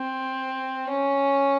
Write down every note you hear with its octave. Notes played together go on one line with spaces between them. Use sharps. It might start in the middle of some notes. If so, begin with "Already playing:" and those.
Already playing: C4
C#4